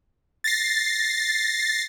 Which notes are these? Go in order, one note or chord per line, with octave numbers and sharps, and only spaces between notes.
A6 A#6 C7